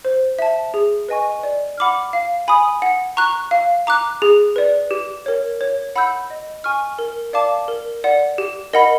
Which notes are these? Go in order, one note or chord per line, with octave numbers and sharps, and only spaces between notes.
C5
E5 A5
G#4
B4 D#5 G#5 C#6
D5
F#5 B5 D6 F6
F5
G#5 B5 D#6
F#5
A#5 C#6 F#6
F5
A#5 D6 F#6
G#4
B4 D5
G4
A#4 C#5
C#5
F#5 B5 E6 G6
D#5
G#5 C#6 F6
A#4
D5 F5 A5 D6
A#4
D5 F#5
G4
A#4 D#5 F#5 B5